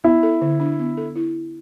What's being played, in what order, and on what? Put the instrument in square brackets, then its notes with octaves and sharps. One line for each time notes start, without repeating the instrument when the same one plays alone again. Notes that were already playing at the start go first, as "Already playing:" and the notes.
[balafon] B3 [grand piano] E4
[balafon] A4
D3
D4
B3
A4
E4